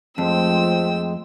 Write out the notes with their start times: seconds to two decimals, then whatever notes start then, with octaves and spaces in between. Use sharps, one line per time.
0.18 F2 F3 G#3 A3 C4 G5 E6